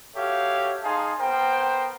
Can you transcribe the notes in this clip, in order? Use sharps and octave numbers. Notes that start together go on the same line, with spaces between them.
F#4 G4 A4 C#5 E5 F5
D#4 G#4 F5 G#5 A5 C6
B3 A#4 C5 G5